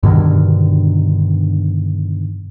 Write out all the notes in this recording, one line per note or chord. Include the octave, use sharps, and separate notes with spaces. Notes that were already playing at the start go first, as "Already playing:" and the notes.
G2 B2 D3 D#3